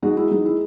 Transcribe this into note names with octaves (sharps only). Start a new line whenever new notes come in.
G#3 D#4 F#4
E4
G#3 D#4
E4